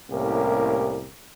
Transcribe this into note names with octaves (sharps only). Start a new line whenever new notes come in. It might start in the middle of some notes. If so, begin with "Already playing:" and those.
C2 A2 A#3 C#4 G4 A#4